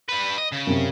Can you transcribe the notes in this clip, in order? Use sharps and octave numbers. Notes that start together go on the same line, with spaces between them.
G3 B4
D#5
C#3
F#2 C3